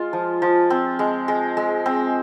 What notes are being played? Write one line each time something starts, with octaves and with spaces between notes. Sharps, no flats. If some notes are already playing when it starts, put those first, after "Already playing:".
Already playing: G#3 F4
F3
F3
C4
G#3
G#3
G#3
C4